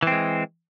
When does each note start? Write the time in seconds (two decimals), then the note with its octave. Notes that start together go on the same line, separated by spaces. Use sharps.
0.03 E3
0.07 C4
0.12 G#3